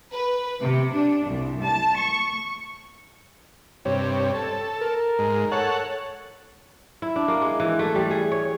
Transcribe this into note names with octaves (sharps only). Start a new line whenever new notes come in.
B4
C3
D4
C2
A5
C#6
G2 C3 C#5
A4
A#4
G#2
A4 C#5 F#5
E4
D4
A#3
G#3
E3
A3
G3
G#4
C#5